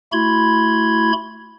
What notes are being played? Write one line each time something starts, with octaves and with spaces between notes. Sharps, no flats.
A3 E4 F#4 B5 C6 G#6